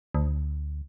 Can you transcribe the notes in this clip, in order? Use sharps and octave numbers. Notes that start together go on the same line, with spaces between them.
D2